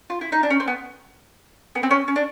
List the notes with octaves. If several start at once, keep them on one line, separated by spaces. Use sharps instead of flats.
F4
E4
D#4
D4
C#4
C4
B3
B3
C4
C#4
C#4
D4